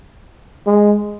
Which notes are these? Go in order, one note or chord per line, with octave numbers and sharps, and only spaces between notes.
G#3